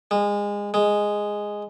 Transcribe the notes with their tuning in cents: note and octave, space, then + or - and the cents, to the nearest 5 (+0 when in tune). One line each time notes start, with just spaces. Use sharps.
G#3 -25
G#3 -5